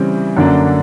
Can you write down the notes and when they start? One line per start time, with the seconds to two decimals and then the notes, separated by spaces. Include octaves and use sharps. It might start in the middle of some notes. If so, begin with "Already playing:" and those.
Already playing: C#3 E3 G3 C4
0.36 F#2 D3 F#3 A#3 D4